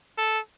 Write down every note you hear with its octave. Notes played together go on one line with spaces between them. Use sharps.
A4